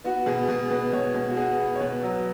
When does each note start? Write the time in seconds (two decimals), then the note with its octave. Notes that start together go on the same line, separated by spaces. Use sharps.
0.04 B3 F#4
0.26 B2 G#4
0.49 B2 G#4
0.71 B2 B4
0.93 B2 C#5
1.14 B2
1.30 F#4
1.36 B3 G#4
1.59 B3
1.76 C#5
1.81 B2 B4
2.03 F#3